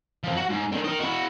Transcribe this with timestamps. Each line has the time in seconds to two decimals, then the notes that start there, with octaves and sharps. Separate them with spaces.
0.24 F3 C4
0.36 F#4 F#5
0.49 G#2
0.72 D3 D#3
0.84 A#4 D#5
1.00 E4 F#4